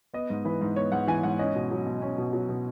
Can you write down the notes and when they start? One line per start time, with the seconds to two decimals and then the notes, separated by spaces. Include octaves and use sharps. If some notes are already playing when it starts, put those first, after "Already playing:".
0.14 B3 D#5
0.30 G#2
0.45 E3 B4
0.61 G#2
0.76 B3 C#5
0.92 G#2 F#5
1.08 E3 G#5
1.23 G#2 F#5
1.39 C#4 D#5
1.55 B2
1.71 F#3
1.86 B2
2.02 C#4
2.18 B2
2.33 F#3
2.49 B2